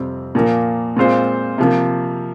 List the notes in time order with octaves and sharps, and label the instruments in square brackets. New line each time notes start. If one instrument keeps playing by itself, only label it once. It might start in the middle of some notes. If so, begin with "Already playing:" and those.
Already playing: [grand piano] F2 C3 G3 C4
A#2 F3 A#3
A#2 G#3 C4 F4 C5
C3 F3 A#3